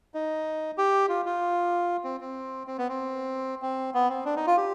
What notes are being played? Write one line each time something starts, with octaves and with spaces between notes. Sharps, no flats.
D#4
G4
F4
F4
C4
C4
C4
B3
C4
C4
B3
C4
D4
D#4
F4
G4